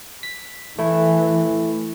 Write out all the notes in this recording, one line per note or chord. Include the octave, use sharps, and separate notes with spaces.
B6
E3 A3 E4